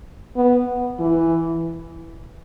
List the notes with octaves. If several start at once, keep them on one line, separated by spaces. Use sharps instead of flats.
B3
E3